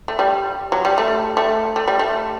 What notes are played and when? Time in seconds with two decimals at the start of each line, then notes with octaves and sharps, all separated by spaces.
0.08 A3
0.19 G3
0.72 F#3
0.85 G3
0.98 A3
1.37 A3
1.76 A3
1.88 G3
1.99 A3